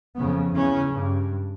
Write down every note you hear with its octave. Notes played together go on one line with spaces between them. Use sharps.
F2 C#3 B3
E2 C#3 C#4
G2